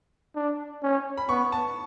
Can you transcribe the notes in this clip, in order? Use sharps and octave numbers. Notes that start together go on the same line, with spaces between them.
D4
C#4
B5
B3 C#6
A5